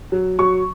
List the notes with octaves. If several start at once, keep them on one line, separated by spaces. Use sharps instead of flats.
F#3
F#3 C#6